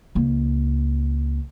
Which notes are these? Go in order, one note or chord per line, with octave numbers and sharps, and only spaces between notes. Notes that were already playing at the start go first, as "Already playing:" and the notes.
C#2 A#3